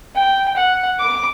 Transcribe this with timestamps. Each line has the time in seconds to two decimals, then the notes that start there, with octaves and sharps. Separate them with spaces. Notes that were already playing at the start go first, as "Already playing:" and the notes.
0.16 G5
0.57 F#5
0.99 D6